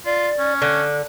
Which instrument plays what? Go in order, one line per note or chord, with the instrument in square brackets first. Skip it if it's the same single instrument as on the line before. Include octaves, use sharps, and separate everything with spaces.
[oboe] F4 [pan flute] D5
[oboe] C#4
[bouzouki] D3 [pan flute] F#6